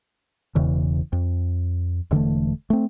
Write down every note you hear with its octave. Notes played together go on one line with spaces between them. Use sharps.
E1 E2 C#3 E3
F2
E1 D3 E3 A3
A3 C4